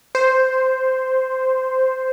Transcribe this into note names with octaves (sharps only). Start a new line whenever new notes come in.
C5